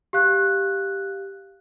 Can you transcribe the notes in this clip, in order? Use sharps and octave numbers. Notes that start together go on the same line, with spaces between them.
G4 F5 F#6